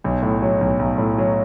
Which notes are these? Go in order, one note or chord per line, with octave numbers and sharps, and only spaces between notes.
B1
A2
F#3
B1
B1
A2
F#3